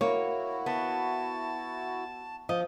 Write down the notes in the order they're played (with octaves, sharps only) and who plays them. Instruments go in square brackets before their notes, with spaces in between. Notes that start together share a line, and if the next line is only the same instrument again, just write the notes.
[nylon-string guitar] A#3 [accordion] E4 F#4 [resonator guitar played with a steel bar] C#5
[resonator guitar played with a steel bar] B3 [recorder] A5
[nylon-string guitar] F3 [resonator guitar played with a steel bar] D#5